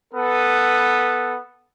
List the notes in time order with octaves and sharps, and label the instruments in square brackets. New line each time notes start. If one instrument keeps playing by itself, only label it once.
[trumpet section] B3 A4 B4